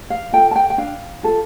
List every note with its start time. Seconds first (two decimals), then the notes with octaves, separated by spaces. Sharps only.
0.10 F5
0.32 F4 A4 G5
0.51 A5
0.56 G5
0.70 G5
0.78 D4 F5
1.23 F4 A4